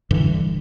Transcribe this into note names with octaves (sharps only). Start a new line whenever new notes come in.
G2 D3 E3